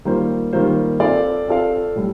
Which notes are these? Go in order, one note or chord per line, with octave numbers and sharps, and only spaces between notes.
D#3 G3 A#3 F4 C5
D#3 G3 A#3 F4 C5
C4 F4 A4 D5 F5
C4 F4 A4 D5 F5
A2 G3